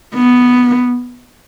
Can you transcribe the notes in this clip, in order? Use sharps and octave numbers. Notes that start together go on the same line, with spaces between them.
B3